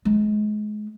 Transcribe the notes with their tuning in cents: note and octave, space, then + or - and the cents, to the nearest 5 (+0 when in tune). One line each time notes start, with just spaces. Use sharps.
G#3 +30